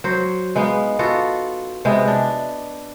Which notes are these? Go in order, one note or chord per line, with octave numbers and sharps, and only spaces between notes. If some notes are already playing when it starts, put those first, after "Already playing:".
F#3 C5
G#3 B3 D#4 F5
B3 F4 F#4 A4
C3 G#3 B3
D4